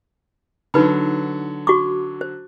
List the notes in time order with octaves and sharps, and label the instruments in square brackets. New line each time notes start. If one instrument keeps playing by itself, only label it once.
[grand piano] D3 F#3 [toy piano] D#4 B4 B5
[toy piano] F#4 C#6 D6
C5